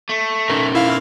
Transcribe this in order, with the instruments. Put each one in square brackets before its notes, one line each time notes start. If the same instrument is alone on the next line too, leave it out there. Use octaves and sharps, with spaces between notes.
[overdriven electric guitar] A3
[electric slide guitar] C#4 D#4 A#4
[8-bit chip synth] E4 F5